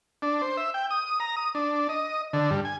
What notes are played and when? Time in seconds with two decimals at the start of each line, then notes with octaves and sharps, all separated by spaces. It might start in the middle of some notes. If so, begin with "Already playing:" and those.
0.22 D4
0.41 C5
0.57 E5
0.74 G5
0.91 D#6
1.20 A#5
1.37 D#6
1.55 D4
1.89 D#5
2.33 D3
2.50 G2
2.65 G#5